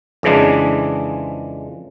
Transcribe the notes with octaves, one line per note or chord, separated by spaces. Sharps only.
F2 C#3 E3 G#3 D4